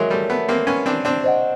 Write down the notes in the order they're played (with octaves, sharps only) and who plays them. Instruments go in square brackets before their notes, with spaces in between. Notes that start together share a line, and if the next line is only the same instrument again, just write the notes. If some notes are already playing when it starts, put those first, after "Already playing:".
Already playing: [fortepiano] F#3 G#3 [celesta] A#4 C#5 E5
[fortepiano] G3 A3
A3 B3
A#3 C4
B3 C#4
C4 D4
C4 D4
[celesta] C5 D#5 F#5